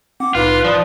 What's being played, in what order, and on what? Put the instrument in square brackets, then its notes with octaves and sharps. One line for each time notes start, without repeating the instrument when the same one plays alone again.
[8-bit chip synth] C4 F#5 [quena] D6
[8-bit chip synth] C2 A2 D#4 [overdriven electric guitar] F4 [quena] B4
[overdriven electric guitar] F3 [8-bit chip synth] D5 D#6